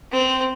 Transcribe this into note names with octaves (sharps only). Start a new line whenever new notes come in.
C4